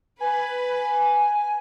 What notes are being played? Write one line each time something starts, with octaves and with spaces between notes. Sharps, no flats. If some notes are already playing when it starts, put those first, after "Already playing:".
B4 G#5